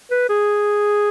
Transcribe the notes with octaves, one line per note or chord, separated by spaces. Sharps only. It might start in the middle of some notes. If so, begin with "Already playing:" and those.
B4
G#4